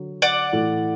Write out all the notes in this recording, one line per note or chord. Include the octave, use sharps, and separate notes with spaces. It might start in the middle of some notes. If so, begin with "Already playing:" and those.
Already playing: D3 F#3
D5 F#5
A2 E3 A3